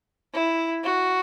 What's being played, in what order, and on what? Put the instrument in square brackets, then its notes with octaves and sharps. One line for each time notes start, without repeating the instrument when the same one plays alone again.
[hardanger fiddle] E4
F#4